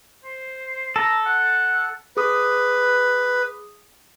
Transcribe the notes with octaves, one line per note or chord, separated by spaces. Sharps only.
C5
A4 A#5
F#5
G#4 B4 D6 D#6